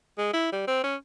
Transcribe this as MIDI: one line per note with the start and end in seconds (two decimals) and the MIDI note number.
0.18 0.33 56
0.33 0.47 64
0.52 0.66 55
0.68 0.83 60
0.84 0.96 61